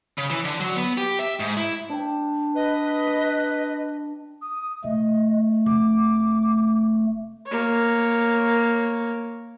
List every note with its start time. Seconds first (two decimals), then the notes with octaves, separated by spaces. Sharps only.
0.18 C#3
0.30 E3
0.45 D3
0.60 F#3
0.77 B3
0.97 G4
1.19 E5
1.40 G#2
1.57 E4
1.89 D4 G5
2.56 B4 D#5
3.07 D6
4.42 D#6
4.84 B2 A3 D#5
5.66 F1 D6
7.46 A#3 C#5